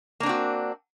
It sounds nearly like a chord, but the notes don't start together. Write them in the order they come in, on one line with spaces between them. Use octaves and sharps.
A#3 D4 C4 F#4